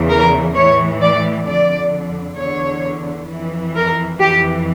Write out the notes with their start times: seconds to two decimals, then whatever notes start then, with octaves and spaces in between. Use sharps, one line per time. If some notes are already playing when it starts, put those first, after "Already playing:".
Already playing: E2 C#3 E3
0.10 A#4
0.55 A2 E3 C#5
1.01 D5
1.47 F2 D3 D5
2.38 E2 D3 C#5
3.29 F2 E3
3.75 A#4
4.20 F2 E3 G4